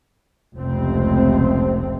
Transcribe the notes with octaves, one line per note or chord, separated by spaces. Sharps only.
F1 C#2 C3 A3 C4